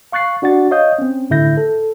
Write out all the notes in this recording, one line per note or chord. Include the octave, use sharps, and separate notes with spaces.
F5 C#6 F#6 A6 C7
D4 F#4 D5 F#5 A6
C#5 D#5 F5 D#6 G6
C4 C#4
A2 D3 E4 E5 G6 A#6
A4